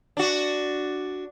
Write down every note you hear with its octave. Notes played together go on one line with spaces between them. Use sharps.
D4 F#4